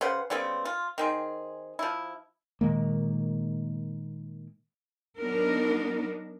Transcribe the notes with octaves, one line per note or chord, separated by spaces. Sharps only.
C#3 B4 C5 F#5
C#3 G3 B3 C4
F4
D#3 C4 G#4
F3 E4
A#2 D#3 G#3 A#3
F#3 B3 D4 D#4 A#4